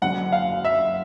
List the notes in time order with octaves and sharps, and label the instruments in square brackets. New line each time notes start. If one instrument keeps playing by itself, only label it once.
[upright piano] F#1 F#2 D3 [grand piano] F#5
[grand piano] F5
E5